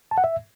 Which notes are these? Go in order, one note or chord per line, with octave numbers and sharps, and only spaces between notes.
A5
F#5
E5